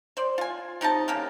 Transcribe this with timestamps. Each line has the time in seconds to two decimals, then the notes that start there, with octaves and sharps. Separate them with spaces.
0.17 C5 D5
0.38 F4 G#5
0.81 C3 D#4 D#5 A5
1.08 C#3 A#3 G4 A#4